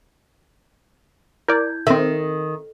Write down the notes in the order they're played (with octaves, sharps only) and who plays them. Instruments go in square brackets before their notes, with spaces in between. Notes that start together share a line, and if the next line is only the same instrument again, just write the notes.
[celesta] E4 G6 G#6 [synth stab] A#4 D5
[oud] D#3 [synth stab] C4 E5 [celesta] A4